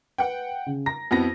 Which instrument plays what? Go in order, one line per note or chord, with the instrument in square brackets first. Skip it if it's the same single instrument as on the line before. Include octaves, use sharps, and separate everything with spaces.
[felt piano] B4 [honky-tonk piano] F#5 G5
[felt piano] C#3
[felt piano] A#5 [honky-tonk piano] A#6
[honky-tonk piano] F2 B3 A#6 [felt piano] C4 E4 F#4